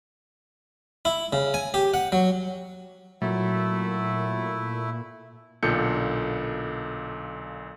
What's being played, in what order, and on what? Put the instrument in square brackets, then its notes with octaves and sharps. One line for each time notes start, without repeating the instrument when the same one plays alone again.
[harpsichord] E4
C#3
G#5
G4
F#5
F#3
[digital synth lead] A#2 [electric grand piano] F#3 [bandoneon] A3 E4
[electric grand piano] B1 A#2 D3 A4 G6 C#7